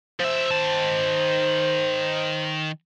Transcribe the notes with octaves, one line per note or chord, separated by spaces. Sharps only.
F3 C5 E5
D#3 A5